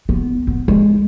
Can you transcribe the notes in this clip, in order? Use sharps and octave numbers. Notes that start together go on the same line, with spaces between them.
B3
B3
G#3